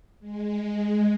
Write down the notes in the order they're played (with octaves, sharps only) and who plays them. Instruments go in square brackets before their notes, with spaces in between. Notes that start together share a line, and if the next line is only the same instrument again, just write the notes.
[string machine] G#3